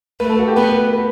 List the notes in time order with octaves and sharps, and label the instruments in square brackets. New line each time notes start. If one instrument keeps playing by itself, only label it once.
[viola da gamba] A3 [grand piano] B4
[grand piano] A4
F#4
G4
[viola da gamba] B3 [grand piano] B4
[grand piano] B4
B4